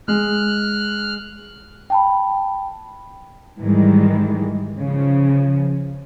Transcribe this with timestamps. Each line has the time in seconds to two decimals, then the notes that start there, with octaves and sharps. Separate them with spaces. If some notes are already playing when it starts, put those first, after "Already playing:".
0.08 G#3 F6 F#6
1.90 G5 A5 B5
3.60 G#2 D#3 E3 G3 G#3
4.79 C#3 F3